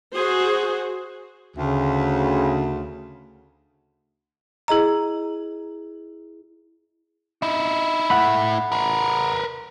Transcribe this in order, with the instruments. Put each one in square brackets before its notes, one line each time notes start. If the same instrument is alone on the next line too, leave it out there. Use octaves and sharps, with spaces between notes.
[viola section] F#4 G#4 C5
[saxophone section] D2 [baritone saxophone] C#3
[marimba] E4 G#4 D#5 A#5
[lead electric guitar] D#4 E4
[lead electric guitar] A3 E4 [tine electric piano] F#5 B5
[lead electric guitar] A#4 B4